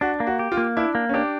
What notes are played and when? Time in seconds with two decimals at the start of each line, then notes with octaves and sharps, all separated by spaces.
0.01 D4 F#4
0.20 A#3
0.27 F#4
0.39 G4
0.52 F4
0.57 A#3
0.77 D4 E4
0.95 A#3
1.09 C#4
1.14 D4 G4